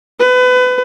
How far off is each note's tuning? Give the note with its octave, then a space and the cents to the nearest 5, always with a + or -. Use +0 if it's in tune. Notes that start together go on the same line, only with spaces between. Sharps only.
B4 +30